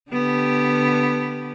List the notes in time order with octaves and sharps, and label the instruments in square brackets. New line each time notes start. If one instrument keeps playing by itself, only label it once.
[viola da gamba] D3 B3 G4